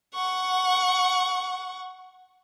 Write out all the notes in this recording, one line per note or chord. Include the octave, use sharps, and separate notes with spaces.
F#5 C#6